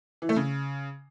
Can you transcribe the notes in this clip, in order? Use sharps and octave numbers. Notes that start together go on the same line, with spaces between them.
E3
A3
C#3